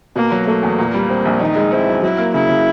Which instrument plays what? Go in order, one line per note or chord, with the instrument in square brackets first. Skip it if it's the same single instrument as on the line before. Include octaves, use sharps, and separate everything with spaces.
[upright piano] B2 [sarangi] A#3
[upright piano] F#3
[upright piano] A3 [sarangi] A#3
[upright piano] E2
A#2
G3
C4
A#1
[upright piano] D#3 [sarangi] D#4
[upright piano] G#3
[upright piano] C4 [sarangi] E4
[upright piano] F#2
[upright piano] F#3 [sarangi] E4
[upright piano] A#3
[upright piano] C#3 [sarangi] E4
[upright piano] C#3